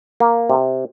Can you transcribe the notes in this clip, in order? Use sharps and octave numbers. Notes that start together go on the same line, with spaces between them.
A#3
C3